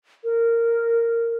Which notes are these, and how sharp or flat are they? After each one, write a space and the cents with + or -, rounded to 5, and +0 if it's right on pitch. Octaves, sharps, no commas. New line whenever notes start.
A#4 -10